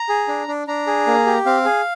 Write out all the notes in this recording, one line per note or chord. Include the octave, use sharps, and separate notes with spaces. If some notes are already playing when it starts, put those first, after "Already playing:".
Already playing: A#5
G#4
D4
D4
D4 A#5
G#4
A#3
G4
C4 F5
G#4